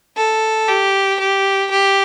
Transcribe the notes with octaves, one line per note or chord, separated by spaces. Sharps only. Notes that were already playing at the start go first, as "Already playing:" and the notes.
A4
G4
G4
G4